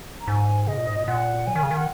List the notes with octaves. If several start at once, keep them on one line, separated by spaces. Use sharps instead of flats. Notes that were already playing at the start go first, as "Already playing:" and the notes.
A#5
G#2 G#5
C#3 D#5
A#2
G#2
A#2
A#2 F#5
F#3 G#5
D#3
C#3
D#3
F#5